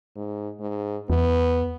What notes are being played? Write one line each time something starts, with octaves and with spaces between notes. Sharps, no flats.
G#2
G#2
E2 B3